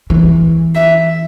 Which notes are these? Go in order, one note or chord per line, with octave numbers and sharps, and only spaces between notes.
E3
E5